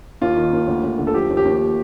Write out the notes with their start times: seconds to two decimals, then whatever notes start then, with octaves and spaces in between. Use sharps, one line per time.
0.21 D#2 F4
0.36 D#3
0.53 D#2
0.68 D2
0.83 D2
0.98 D3
1.07 A4
1.14 F3 G4
1.30 D#2
1.37 G4
1.45 D#2